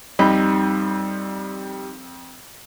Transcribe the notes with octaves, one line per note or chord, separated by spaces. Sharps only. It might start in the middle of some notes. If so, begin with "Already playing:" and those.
F2 G3 D#4 B5